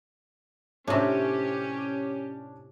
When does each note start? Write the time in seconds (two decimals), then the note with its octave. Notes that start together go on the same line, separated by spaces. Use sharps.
0.87 A2 C3 C#4 D4 G4 C#5